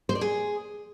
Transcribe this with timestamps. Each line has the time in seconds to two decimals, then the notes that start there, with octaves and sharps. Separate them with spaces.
0.09 C5
0.15 D5
0.21 G#4